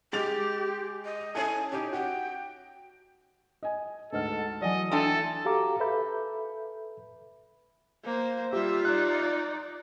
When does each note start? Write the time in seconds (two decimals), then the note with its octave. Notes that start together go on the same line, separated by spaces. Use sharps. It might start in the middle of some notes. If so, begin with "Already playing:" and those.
0.13 G#3 G4 A6 F7
1.05 D#5
1.35 C#4 E4 A4 G#5
1.72 C#4 D#4 G4
1.93 F#4 G5
3.63 D#5 G#5
4.13 D2 G#2 A4 B4 D#5 F6
4.62 E3 F#3 D5 D#5 G#5
4.91 A3 D4 A4 E5 G5 G#5 C6
5.45 F#4 G4 A4 F5 A#5 D6
5.80 A4 B4 E5 B5 G6
8.04 A#3 C5
8.53 G3 F4 G4 E5
8.85 D#4 D5 F#6